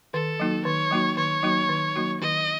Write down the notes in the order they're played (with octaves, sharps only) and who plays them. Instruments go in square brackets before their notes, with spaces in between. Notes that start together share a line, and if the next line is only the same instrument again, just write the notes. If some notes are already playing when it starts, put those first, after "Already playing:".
[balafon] D#3 [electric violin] A4
[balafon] F#3 A#3 D#4 F#4
[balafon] D#3 [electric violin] C#5
[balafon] F#3 A#3 D#4 F#4
[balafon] D#3 [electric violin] C#5
[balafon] F#3 A#3 D#4 F#4
D#3
F#3 A#3 D#4 F#4
[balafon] D#3 [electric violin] D#5